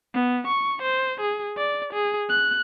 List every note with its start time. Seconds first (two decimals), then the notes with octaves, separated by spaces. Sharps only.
0.14 B3
0.48 C#6
0.83 C5
1.21 G#4
1.57 D5
1.94 G#4
2.29 F#6